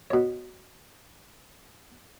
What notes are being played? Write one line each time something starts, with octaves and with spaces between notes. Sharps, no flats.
B2 C#5